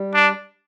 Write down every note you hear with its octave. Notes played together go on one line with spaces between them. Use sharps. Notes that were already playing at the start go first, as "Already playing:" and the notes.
Already playing: G3
D4